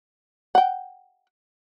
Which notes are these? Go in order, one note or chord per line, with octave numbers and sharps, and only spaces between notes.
F#5 G5